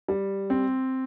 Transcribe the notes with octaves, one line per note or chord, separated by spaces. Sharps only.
G3
C4